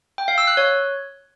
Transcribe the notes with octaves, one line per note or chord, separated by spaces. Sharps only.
G5
F5
E6
F#6
C#5